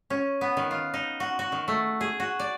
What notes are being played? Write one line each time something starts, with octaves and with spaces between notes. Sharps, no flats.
C#4
B3
D#3
F4
D#4
F#4
F#4
D#3
A3
G#4
F#4
D5